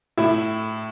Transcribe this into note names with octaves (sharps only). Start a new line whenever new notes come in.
A2 E4